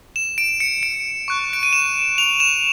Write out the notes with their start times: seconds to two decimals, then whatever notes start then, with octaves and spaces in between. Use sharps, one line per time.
0.16 E7
0.38 D7
0.60 C#7
0.83 D7
1.28 C#6 F#6
1.53 D7
1.63 D#7
1.73 E7
2.18 F7
2.40 E7